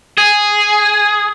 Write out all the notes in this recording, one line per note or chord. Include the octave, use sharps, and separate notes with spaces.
G#4